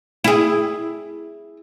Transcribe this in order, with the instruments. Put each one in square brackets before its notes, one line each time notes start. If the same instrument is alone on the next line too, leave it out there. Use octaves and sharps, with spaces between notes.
[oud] E4 G#4